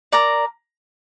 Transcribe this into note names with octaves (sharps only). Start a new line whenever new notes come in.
A#4 D5 A#5